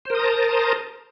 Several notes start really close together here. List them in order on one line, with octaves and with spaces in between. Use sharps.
C5 A#4 D#6 A#5 A5